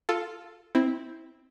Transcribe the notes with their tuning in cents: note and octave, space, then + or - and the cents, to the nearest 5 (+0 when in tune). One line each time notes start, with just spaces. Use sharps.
F4 +0 A4 +0
C4 +5 E4 -15